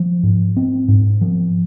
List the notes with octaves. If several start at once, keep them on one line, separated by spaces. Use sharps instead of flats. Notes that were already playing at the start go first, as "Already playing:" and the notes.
Already playing: F3
G#2
C4
G#2
F3